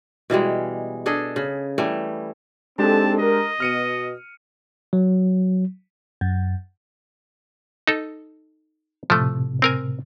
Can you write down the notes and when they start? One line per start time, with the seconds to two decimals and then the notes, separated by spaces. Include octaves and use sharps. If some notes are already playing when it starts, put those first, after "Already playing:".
0.30 B2 E3 G3 G#3
1.06 D4 G#4 A4 D#5
1.36 C#3
1.78 E3 G3 A3
2.79 G#3 C4 D4 D#4 G4 A4 A5
3.19 A#4 D#5
3.60 B2 F6 C#7 D#7
4.93 F#3
6.21 F#2
7.88 D#4 A4
9.10 A2 C3 F3 A3
9.62 C4 A#4 G#5